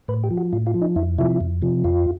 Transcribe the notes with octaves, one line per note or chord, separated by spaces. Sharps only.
A2 B4
G4
F3
F#4
A2 F4
F4
F3
D#4
F2 E4
C3 F3 E4
F2
C3 F3
F2 F4